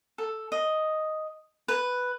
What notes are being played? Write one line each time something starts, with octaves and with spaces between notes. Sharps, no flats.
A4
D#5
B4